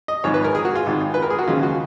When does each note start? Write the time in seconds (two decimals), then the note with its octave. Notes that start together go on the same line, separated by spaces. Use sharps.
0.08 D#5
0.24 G#1 G#2 F3 C#5
0.34 B4
0.45 A#4
0.55 G#4
0.65 F#4
0.75 F4
0.86 G#1 G#2 D#3
1.14 B4
1.22 A#4
1.30 G#4
1.39 F#4
1.48 D#2 C#3 F3 G#3 F4
1.63 F#4